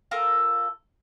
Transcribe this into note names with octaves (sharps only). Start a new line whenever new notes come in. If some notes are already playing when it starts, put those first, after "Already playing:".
F4 A4 A#4